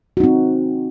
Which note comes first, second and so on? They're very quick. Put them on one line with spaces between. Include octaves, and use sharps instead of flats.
F#4 D#4 C4